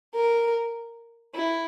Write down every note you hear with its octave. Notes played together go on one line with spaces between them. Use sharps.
A#4
E4